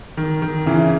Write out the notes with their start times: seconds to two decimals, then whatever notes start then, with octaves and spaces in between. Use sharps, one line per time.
0.17 D#3
0.42 D#3
0.66 C#3 E3